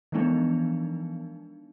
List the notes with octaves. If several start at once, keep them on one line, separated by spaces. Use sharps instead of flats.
E3 F3 G#3 B3 D4 D#4